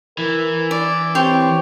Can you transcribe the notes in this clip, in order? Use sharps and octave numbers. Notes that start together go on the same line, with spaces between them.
E3 A#4
D5
C4 G4 C#5 C6